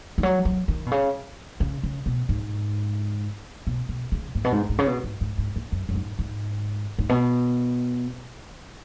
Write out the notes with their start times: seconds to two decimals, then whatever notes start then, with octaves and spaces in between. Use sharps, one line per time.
0.18 D#3
0.23 F#3
0.45 F#3
0.68 D#3
0.86 B2
0.91 C#3
1.60 C#3
1.83 C#3
2.06 B2
2.29 G#2
3.67 B2
3.89 B2
4.12 C#3
4.35 G#2
4.44 B2
4.52 G#2
4.69 G#2
4.79 C#3
4.87 B2
5.04 G#2
5.21 G#2
5.38 G#2
5.56 G#2
5.72 F#2
5.89 F#2
5.95 G#2
6.19 G#2
6.99 G#2
7.09 B2